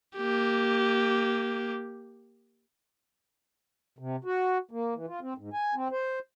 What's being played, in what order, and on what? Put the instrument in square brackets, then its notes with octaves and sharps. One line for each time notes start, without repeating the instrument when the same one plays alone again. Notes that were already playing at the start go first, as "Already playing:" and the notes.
[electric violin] A#3 G4
[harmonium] C3
F#4
A#3
E3
F4
C4
G#2
G#5
C4
C5